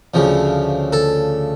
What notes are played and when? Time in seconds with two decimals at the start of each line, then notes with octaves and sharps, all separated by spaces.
0.14 D2 C#3 F3
0.93 A4